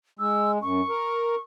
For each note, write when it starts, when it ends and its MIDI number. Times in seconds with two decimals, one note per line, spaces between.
0.19 0.58 56
0.19 0.52 88
0.62 0.81 42
0.62 1.41 85
0.89 1.35 70